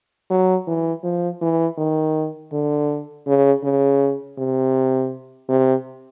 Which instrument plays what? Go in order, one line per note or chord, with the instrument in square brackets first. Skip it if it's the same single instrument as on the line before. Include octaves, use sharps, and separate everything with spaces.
[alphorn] F#3
E3
F3
E3
D#3
D3
C#3
C#3
C3
C3